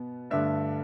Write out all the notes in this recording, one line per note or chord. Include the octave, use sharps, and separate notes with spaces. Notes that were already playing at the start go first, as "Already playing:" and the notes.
Already playing: B2 B3
G2 D3 A3 E5